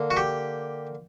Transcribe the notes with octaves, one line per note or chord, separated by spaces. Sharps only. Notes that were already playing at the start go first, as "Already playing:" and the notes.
Already playing: D3 A#3
F#4
G4